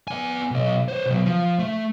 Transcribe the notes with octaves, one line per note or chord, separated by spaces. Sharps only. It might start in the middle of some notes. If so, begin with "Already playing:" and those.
B3 G#5
B1 D#5
C5 C#5
B2 F#3
F3
A3